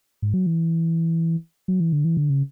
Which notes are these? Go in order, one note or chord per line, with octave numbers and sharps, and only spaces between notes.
G#2
F#3
E3
F#3
E3
D3
E3
D3
C#3